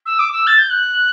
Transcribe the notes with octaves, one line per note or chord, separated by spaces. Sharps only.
E6
D6
E6
A6
G6
F#6